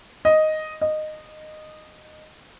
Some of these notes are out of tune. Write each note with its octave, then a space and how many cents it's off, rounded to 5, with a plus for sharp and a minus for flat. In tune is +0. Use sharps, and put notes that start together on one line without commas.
D#5 +0
D#5 -15